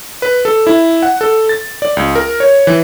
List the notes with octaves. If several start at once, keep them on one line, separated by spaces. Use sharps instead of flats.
B4
A4
E4
F#5
A4
A6
D5
C#2
A#4
C#5
E3